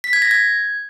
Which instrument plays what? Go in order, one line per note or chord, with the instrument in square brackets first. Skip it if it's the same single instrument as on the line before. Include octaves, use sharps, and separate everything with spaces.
[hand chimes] B6
G#6
A#6
G#6